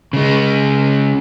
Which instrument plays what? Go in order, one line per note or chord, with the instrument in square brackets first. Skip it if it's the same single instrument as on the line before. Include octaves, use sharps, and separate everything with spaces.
[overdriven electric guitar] C#3 G#3